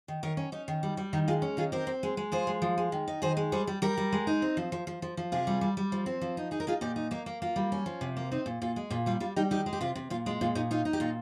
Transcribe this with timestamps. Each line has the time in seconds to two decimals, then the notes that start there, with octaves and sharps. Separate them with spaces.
0.08 D#3
0.23 D#3 A#4 C#5
0.37 C#4
0.52 C#4 D#4
0.68 D#3
0.83 G3
0.97 G3
1.13 D#3 D#4
1.28 G#3 F4
1.42 C#4
1.57 D#3 F4 G#4
1.72 C4 G4 A#4
1.87 C4
2.03 G#3
2.17 G#3
2.32 F3 G#4 C5
2.47 G#3
2.62 F3
2.78 G#3
2.92 D#3
3.08 D#4
3.22 D#3 G#4 C5
3.37 G#3
3.52 G3 G#4 C5
3.67 G3
3.82 G3 G4 A#4
3.97 G3
4.12 G#3
4.27 D#4
4.42 C4
4.57 F3
4.72 F3
4.87 F3
5.02 F3
5.17 F3
5.32 C3 F4 G#4
5.47 G3
5.61 G3
5.77 G3
5.92 F3
6.06 C4
6.21 F3
6.37 D#4
6.51 D#4 G#4
6.60 A#4
6.67 D#4 F4 G#4
6.81 A#2 D#4 G4
6.96 D#4
7.11 A#3 D#4
7.26 A#3
7.42 A#3 F4
7.56 G3
7.72 C#4
7.86 F3
8.01 C3
8.17 A#3
8.31 C4 D#4
8.46 A#2
8.62 A#2 F4
8.76 G#3
8.90 A#2 F4
9.06 G3 F4
9.20 G3 F4
9.36 G3 D#4 G4
9.51 D#3 D#4 G4
9.66 G#3
9.73 G4
9.81 C3 F4
9.95 C3
10.10 A#2 F4
10.26 G#3 F4
10.41 A#2 F4
10.55 A#2 D#4
10.71 D#4 F4
10.85 D#4
10.93 G4
11.00 A#2 F4